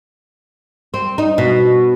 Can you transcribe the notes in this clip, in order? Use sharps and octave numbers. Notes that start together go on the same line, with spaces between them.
C4
D#4
B2